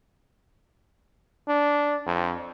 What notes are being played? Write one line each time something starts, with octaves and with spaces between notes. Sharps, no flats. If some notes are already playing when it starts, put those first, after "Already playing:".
D4
F2